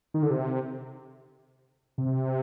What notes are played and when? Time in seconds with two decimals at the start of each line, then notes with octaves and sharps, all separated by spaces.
0.14 D#3
0.23 D3
0.30 C3
1.98 C3